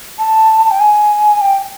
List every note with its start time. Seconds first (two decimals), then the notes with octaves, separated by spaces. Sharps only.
0.19 A5
0.71 G5
0.80 G#5
1.41 G5